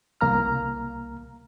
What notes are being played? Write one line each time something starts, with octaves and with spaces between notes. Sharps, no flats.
C2 A#3 A#5 F6